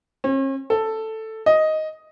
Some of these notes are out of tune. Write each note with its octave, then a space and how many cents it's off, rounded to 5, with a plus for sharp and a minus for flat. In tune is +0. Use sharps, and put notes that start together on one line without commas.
C#4 -45
A4 +5
D#5 +5